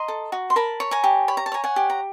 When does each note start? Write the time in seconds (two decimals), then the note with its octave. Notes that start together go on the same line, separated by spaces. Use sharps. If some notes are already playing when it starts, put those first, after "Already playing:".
Already playing: D#5 A#5 C6
0.08 A4
0.32 F#4
0.50 C6
0.56 A#4 A5 B5
0.80 C#5
0.91 G#5 A#5
1.04 G4
1.28 C#5 B5
1.37 A#5
1.46 A5
1.52 C#5 G#5 A#5
1.64 F#5 G#5
1.76 G4
1.90 A#5